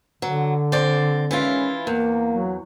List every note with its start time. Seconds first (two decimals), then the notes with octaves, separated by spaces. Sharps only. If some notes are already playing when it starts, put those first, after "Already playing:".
0.22 D3 F#3
0.72 C4 D5
1.31 D#3 E3 G#3 C#4 E4 F4
1.87 E2 A#3
2.32 F#3